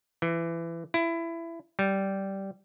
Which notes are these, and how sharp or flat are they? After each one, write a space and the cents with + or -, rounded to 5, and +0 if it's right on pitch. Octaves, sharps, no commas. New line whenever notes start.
E3 +20
E4 +20
G3 -10